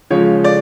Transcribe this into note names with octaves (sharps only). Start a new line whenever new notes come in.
C#3 F3 G#3 C#5
D5